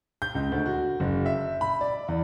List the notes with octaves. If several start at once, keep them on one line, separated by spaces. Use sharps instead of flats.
G6
C#2
D2
F#4
F#1
E5
B5
D5
E2